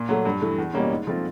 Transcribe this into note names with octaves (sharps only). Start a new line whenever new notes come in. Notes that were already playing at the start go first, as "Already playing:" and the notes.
Already playing: A#2
F#3 A3
G2
E3 A3
E2
B2 G3 A#3 C#4
G#2
F3 A3 C4 F4